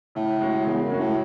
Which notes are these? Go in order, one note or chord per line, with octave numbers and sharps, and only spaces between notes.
A2 C#3
G#3 C#4 F#4
E2 C#3
F#2
G#3 C#4 F#4
A2